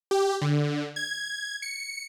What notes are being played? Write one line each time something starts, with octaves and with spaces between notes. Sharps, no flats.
G4
D3
G#6
C#7